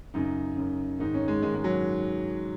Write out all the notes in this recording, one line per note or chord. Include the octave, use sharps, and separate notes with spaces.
F#2 C#3 D#4
F#2 C#3
G#2 D#3 D#4
C#4
G#3
G#2 D#3 G#3
G#3
F#3